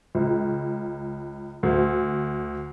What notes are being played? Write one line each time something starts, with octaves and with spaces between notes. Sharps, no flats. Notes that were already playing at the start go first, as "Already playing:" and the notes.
C#2
D2